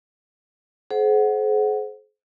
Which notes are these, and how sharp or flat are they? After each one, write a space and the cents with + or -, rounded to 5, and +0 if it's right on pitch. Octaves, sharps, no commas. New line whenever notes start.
G#4 +45 C5 +0 F#5 +0